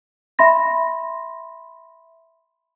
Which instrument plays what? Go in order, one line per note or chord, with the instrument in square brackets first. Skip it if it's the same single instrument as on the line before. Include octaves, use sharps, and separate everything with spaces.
[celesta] E5 B5 C6 A#6